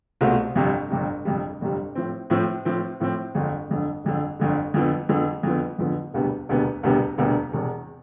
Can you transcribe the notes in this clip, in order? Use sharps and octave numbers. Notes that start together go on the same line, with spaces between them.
C2 B2 A3 C4 F4
G1 F2 C3 G3
G1 F2 C3 G3
G1 F2 C3 G3
G1 F2 C3 G3
A2 F3 C4
A2 F3 C4
A2 F3 C4
A2 F3 C4
G1 F2 D3
G1 F2 D3
G1 F2 D3
G1 F2 D3
F2 D3 F3 B3
F2 D3 F3 B3
F2 D3 F3 B3
F2 D3 F3 B3
E1 D2 C3 G3 B3
E1 D2 C3 G3 B3
E1 D2 C3 G3 B3
E1 D2 C3 G3 B3
E1 E2 C3